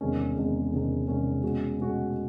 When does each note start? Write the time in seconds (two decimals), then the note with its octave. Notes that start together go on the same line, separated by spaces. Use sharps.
0.01 E2 C3 D#3 G#3 C#4
0.36 E2 C3 D#3 G#3 C#4
0.71 E2 C3 D#3 G#3 C#4
1.07 E2 C3 D#3 G#3 C#4
1.42 B2 G#3 C#4 F#4
1.78 B2 G#3 C#4 F#4